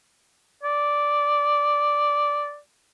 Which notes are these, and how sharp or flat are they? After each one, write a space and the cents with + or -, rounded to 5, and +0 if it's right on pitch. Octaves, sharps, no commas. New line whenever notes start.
D5 -5